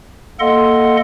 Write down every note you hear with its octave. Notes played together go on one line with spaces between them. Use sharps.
A#3 A4 D#5 F#5 C6